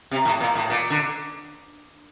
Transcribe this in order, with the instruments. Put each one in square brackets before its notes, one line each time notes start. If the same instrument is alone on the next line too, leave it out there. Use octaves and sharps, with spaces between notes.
[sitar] C3
A2
A#2
A2
A#2
D3